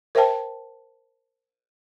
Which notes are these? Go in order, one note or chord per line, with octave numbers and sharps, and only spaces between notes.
A#4 C5 E5 G5 A5